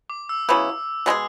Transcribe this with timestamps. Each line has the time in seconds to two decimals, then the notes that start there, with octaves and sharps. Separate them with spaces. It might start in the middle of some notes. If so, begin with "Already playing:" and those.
0.10 D6
0.29 E6
0.49 C#3 F#3 B3 E4
1.06 B2 G#3 D4 G#4